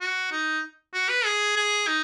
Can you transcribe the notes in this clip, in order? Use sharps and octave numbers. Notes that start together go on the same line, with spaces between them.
F#4
D#4
F#4
B4
G#4
G#4
D#4